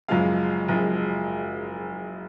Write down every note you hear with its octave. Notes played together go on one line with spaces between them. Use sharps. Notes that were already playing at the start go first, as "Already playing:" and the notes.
F#1 F#2 F3 G#3 F5
F#1 F#2 F3 G#3